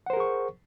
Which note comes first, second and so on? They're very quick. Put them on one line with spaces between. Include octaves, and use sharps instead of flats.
F#5 C5 A#4 G#4 C#6